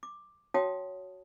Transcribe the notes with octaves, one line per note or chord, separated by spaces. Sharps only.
D6
F#4 C#5 F5 G5 A5 D#6